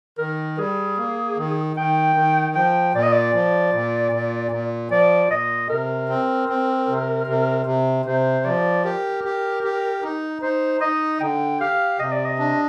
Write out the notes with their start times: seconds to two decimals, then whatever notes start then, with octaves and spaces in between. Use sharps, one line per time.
0.18 D#3 A#4
0.58 G3 G#4
0.98 A#3
1.37 D#3
1.77 D#3 G5
2.16 D#3
2.55 F3 G5
2.94 A#2 D5
3.03 D#5
3.12 D5
3.34 F3
3.73 A#2
4.12 A#2
4.51 A#2
4.91 F3 D5
5.30 A#2 D#5
5.70 C3 A#4
6.09 C4
6.49 C4
6.88 C3
7.27 C3
7.66 C3
8.06 C3 C5
8.45 F3 D5
8.84 G4 A#4
9.24 G4
9.63 G4
10.02 D#4
10.42 D#4 C5
10.81 D#4 D#5
11.20 D3 G5
11.60 G4 F5
11.99 C3 D#5
12.12 D5
12.25 D#5
12.39 D4